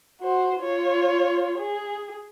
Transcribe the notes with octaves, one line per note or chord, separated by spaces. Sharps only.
F#4 C5
F4 C#5
G#4